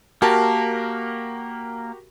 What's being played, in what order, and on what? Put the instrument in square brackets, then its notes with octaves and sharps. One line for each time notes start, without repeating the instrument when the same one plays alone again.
[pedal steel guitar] A#3 [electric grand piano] F#4 G4 A#4 [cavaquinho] A5